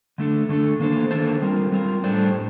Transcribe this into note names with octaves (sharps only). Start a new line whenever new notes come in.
D3 A3 D4 A4
D3 A3 D4 A4
D#3 A#3 D4 A4 C5
D#3 A#3 D4 A4 C5
G3 C4 F4 A#4
G3 C4 F4 A#4
A2 G3 D4 A4 C5
A2